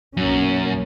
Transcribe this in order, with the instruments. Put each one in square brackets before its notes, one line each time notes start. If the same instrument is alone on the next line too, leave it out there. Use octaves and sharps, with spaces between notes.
[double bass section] B1 A#3 C#4 [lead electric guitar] F#2